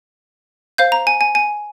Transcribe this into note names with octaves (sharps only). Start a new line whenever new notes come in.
C5 F5 G6
A#5
G#5
G#5
G#5